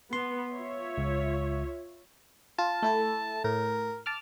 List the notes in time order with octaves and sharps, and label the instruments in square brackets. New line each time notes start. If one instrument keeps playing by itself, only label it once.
[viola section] B3 [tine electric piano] C6
[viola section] F4 C#5 E5
[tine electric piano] C#2
[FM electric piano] F4 [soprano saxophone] A5
[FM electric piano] A3 E4 A4
[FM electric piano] A2 [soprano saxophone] A#4
[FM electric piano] A5 D6 F6